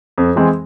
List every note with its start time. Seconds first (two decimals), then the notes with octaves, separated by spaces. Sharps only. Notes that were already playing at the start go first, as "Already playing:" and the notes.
0.18 F2
0.36 E3 G#3 C4 G#4